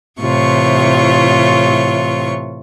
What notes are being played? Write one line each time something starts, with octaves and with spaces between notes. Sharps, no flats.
A2 C3 E3 F4 C#5 C#6